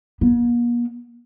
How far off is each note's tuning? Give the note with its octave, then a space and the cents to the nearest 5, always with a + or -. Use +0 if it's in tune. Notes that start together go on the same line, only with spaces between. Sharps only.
A#3 +45